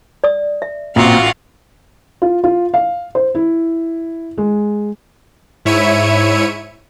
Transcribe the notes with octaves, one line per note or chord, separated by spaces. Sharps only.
D5 D#6
E5
A1 A#2 C4 F4 F#4 F5
F4
F4
F5
C5
E4
G#3
G#2 E4 C#5 E5 C#7 D#7